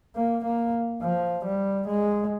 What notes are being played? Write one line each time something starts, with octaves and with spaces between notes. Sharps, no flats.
A#3
A#3
F3
G3
G#3